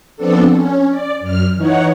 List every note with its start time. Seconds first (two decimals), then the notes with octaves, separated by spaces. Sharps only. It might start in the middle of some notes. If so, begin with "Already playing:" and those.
0.17 F3 B3 C4 D4 A4
0.52 C#4
0.91 D5
1.20 F#2 F6
1.56 E3 D#4 C#5 F#5